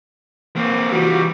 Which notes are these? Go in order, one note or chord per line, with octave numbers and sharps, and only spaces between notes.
A#3 C4
E3 G3 F4 F#4